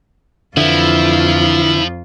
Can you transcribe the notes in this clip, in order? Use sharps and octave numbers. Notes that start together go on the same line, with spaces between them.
F2 D3 E3 F3 E4 F4